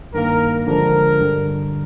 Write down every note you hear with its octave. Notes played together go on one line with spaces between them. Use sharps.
G2 D#3 A#3 A#4
D3 F3 G#3 D4 A#4
G2 D3 G3